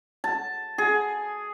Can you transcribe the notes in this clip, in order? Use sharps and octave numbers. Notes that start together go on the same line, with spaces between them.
A5
G#4